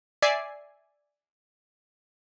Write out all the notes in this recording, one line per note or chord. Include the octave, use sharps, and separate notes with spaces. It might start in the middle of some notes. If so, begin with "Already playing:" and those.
D5 E5 G#5 C7